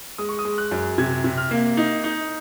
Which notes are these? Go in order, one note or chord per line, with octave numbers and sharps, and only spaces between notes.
G#3 D#6
C#6
D#6
G#3
F#6
F#2
C3 G#6
C3
F6
A#3
D#4
D#4